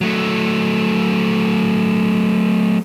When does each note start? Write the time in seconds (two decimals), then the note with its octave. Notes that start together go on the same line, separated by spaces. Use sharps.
0.01 F#3 A3